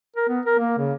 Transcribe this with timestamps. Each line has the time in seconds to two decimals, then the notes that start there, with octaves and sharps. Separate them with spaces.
0.17 A#4
0.29 B3
0.46 A#4
0.59 A#3
0.78 C#3